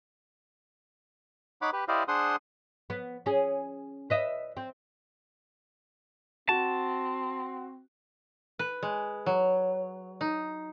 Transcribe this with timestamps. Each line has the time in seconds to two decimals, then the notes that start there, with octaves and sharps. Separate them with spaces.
1.62 D#4 C#5 F#5 B5 D6
1.73 G4 B4
1.88 E4 G4 C5 D5 D#5 F5
2.08 D4 G#4 C5 F#5 C6 D#6
2.90 B3
3.26 C#4 G#4
4.10 B4 D#5 E5
4.57 C4
6.49 C4 F#4 A5
8.59 B4
8.83 G#3
9.26 F#3
10.21 D#4